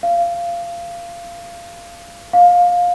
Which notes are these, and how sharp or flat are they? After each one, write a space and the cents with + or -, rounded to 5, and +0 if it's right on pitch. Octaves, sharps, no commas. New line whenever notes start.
F5 -20
F5 +20